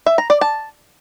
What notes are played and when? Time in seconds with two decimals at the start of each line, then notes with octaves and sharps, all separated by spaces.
0.06 E5
0.18 A#5
0.30 D5
0.41 A5